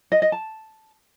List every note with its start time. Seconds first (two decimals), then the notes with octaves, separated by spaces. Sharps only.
0.12 D#5
0.22 D#5
0.32 A5